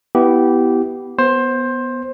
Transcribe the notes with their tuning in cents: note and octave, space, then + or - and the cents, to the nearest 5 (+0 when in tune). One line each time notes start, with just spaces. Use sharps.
B3 +0 E4 -10 G4 -15
B3 +0 C5 +15